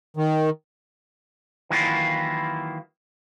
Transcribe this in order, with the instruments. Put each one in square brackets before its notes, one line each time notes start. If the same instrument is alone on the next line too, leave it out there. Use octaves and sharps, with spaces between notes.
[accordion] D#3
[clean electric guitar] D#3 E3 F#3 A#3 E4 F4